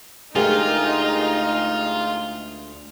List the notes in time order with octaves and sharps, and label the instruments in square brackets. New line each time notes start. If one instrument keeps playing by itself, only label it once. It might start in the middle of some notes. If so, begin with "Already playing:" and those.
[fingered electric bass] D2 G#3 A3 [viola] D#4 [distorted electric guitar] F4 [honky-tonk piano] G4 G#4 A#4